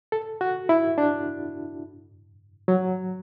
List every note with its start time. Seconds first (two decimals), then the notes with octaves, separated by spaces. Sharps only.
0.12 A4
0.41 F#4
0.69 E4
0.98 D4
2.68 F#3